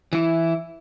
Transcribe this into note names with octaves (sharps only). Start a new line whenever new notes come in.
E3 E4